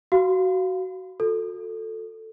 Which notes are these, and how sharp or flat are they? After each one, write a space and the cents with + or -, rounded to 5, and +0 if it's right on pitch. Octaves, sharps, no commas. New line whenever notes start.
F#4 +15 F5 +0 B5 +35
F#4 -35 A4 +10